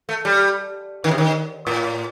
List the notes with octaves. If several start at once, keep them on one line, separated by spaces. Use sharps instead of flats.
A3
G3
D#3
C3
D#3
A2